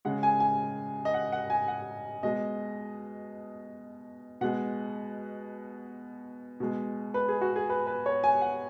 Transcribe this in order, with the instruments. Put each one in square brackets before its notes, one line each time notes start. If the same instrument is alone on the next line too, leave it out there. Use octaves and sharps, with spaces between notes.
[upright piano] C#3 G#3 F#5
G#5
G#5
D#5
F#5
F#5
G#5
F#5
B2 G#3 D#5
B2 G#3 F#5
B2 G#3
B4
G#4
F#4
G#4
B4
B4
C#5
G#5
F#5